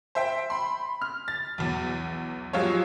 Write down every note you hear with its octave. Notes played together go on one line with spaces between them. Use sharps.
C5 E5 G5
B5 C6
F6
A6
B1 E2
F3 F#3 G#3 F4 G4 C#5